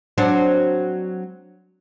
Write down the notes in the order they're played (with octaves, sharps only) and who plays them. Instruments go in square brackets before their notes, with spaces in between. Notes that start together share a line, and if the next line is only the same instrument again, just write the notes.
[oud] F#3 C4 D4